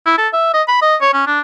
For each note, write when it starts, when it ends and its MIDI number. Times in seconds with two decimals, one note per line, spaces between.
0.06 0.17 64
0.18 0.28 69
0.33 0.52 76
0.54 0.62 75
0.68 0.82 83
0.82 0.96 75
1.01 1.13 73
1.14 1.23 61
1.27 1.40 62